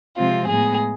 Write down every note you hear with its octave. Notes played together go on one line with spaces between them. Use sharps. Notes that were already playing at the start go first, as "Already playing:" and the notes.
C3 F3 G#3 C4 F4
A2 G#3 B3 G#4